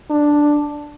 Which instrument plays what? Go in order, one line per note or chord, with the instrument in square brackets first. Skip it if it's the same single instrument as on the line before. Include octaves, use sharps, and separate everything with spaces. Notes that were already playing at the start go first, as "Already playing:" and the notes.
[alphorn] D4